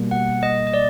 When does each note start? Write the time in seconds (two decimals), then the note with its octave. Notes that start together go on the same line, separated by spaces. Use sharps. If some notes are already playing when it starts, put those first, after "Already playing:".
Already playing: B2 G3 A#3
0.11 F#5
0.43 D#5
0.67 D#5
0.74 D5